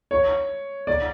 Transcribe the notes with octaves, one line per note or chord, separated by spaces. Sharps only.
C#5
D5